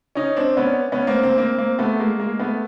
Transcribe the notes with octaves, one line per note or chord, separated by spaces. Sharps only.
C#4 D#4
C4 D4
B3 C#4
B3 C#4
A#3 C4
A#3 C4
A#3 C4
A#3 C4
A3 B3
G#3 A#3
G#3 A#3
A3 B3